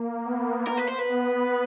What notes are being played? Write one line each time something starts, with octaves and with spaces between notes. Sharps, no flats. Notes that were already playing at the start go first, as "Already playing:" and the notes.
Already playing: A#3
B3
A#4
B4
C5
B4
B3